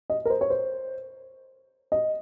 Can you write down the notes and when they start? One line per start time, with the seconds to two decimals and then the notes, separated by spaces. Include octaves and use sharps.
0.10 D#5
0.25 A#4
0.30 C5
0.41 C#5
0.50 C5
1.92 D#5